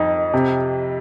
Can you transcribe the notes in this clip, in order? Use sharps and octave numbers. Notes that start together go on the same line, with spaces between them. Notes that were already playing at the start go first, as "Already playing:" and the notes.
Already playing: F2 D#4
C3